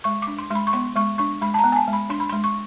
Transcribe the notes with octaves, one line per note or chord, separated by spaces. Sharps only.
G#3 C#6
D4 D6
C6
G#3 C6
B5
C#6
B3 C6
G#3 C#6
D4 C#6
G#3 B5
A5
B3 A#5
G#5
A5
G#3
B5
D4 C6
B5
G#3 C6
C#6